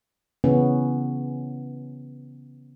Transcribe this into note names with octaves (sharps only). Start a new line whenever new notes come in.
C#3 E3 B3 C#4